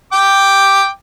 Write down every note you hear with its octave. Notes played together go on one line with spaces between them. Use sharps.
G5 D6